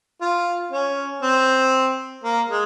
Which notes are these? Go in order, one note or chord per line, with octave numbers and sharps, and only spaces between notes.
F4
C#4
C4
A#3
G#3